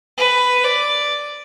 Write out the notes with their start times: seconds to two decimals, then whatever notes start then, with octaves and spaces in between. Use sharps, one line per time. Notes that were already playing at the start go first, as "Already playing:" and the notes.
0.18 B4
0.64 D5